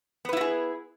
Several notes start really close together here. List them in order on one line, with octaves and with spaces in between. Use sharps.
B3 B4 E4 F#4 G#4